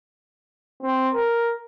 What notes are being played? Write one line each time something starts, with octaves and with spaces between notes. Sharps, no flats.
C4
A#4